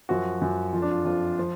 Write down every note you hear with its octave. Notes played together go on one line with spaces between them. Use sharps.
F#2 F3 F#4
F#2 F3
F2 F3 F4
D4
F4
F2 F3 F4
F3